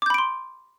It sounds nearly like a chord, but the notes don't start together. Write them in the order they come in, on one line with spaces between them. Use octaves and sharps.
D6 G6 B5 D7 C6